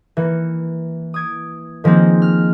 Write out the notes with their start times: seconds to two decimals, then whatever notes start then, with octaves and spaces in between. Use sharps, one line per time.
0.17 E3 A#3 C#7
1.14 D#6 G#6 D7
1.84 D#3 F3 G#3 A#3 C4
2.22 F6